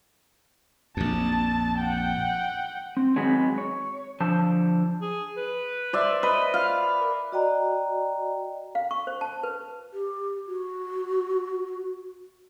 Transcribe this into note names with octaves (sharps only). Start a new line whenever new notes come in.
A#1 F2 A5
F#5 G5
C4
D#3 F#3 G#3 B3 C4 C#5
C#5
D3 F3 C5 A5
G#4
B4
C5 D5 E5
B4 D#5
F4 F5
A#4
F#4 D5 D#5 G5 A#5
F5
C#6
C5
A5
B4
G4
F#4